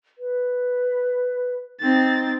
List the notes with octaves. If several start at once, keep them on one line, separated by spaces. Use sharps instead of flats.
B4
C4 D#4 A6